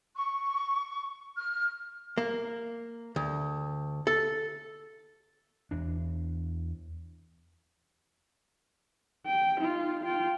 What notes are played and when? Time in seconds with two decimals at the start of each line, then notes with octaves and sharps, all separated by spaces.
0.15 C#6
1.38 F6
2.18 A#3
3.16 D2
4.07 A4
5.71 E2 D4
9.26 G5
9.60 D#4 F4
10.04 F4 G5